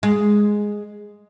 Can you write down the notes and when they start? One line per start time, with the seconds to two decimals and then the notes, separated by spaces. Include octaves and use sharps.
0.03 G#3